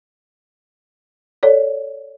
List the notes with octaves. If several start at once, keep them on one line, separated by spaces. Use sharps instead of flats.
A4 C#5 D5